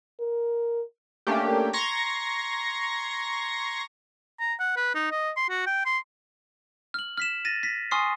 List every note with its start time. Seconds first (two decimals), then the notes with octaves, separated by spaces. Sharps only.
0.20 A#4
1.27 A3 A#3 C#4 D4 G4
1.73 A#5 C6 C#6 G#6 A#6
4.40 A#5
4.60 F#5
4.77 B4
4.95 D#4
5.12 D#5
5.37 C6
5.49 F#4
5.67 G5
5.86 C6
6.94 F6 F#7
7.17 F6 B6 E7
7.45 A6 A#6 D#7
7.63 A#6 B6
7.91 G#5 C6 C#6 D#6 F6 C7